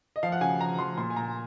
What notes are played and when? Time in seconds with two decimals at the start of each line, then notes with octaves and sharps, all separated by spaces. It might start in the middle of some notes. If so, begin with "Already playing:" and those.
0.16 D#5
0.23 F3 F5
0.32 F#5
0.41 C#3 G#5
0.60 F3 A#5
0.79 F3 C6
0.97 A#2 C6
1.10 G#5
1.16 A#2 A#5